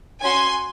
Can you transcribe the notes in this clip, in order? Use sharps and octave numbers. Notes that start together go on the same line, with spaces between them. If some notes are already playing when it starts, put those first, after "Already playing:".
C#4 F#4 G#5 C6